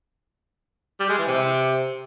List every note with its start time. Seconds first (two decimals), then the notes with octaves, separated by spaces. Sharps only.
1.00 G3
1.09 G#3
1.18 E3
1.27 C3